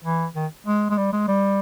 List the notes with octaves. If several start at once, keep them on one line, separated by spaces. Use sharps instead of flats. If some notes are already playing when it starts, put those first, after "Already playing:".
E3
D#3
G#3
G#3
G3
G#3
G3